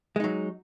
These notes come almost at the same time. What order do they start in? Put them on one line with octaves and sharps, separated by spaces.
G#3 D#4 F#3